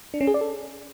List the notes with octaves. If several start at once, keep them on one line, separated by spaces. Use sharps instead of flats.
D4
C#4
G#4
D5
A4